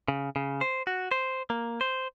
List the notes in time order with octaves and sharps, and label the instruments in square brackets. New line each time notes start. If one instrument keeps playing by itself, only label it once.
[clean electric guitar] C#3
C#3
C5
F#4
C5
A#3
C5